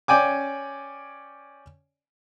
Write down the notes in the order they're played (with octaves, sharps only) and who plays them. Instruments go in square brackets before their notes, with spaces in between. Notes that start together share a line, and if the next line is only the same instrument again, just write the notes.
[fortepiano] C#4 D5 G5 G#5 D6